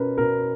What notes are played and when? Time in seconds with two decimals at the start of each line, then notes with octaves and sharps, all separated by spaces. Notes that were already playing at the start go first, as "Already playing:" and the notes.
Already playing: B2 C#4 A#4 B4
0.18 B2 A#4